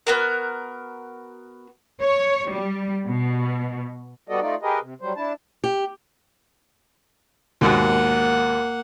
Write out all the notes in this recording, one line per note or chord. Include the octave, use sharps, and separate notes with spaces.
B3 F#4 A#4
C#5
G3
B2
G3 B3 F#4 A4 D5 D#5
A3 D#4 F4 D5
G4 G#4 A#4 B4 D#5
C3
F#3 G3 C5
D4 E4 A5
G4
D#2 G#2 B2 A#3 F#5